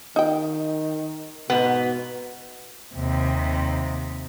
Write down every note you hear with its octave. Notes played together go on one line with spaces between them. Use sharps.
D#3 D#4 G5
G#2 B2 B3
D#2 C3